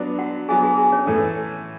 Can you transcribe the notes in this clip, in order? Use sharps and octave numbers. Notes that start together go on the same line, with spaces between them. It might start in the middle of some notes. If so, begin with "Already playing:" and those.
Already playing: F#3 B3 D4
F#4 F#5
F#3 B3 D4 G#4 G#5
G#4 G#5
G#4 G#5
C#4 C#5
A2 E3 A3 A4